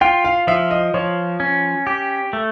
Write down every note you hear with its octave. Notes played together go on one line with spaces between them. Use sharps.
F4 G5
F5
F3 E5
D#5
F3 C#5
C#4
G4
A3